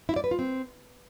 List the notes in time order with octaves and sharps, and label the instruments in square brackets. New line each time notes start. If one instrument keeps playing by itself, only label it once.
[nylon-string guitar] E4
D5
B4
F4
C4